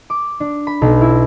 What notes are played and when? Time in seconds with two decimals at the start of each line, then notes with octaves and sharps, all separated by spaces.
0.10 D6
0.40 D4
0.67 B5
0.82 B1
1.01 E4